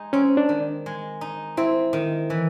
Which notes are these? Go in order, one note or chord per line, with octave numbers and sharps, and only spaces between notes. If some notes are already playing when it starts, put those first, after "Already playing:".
Already playing: G#3 D#4
C4 C#4
D4
D#3
G#3
D#4
C4 E4
D#3
E3